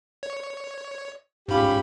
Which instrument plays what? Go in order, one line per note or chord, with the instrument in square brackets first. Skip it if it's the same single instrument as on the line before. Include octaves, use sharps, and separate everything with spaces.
[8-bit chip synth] C#5
[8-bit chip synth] G#2 B5 [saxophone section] C#4 F4 G4